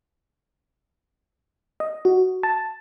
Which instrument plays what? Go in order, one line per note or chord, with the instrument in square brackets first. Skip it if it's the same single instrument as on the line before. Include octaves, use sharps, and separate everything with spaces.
[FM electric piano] D#5
F#4
A5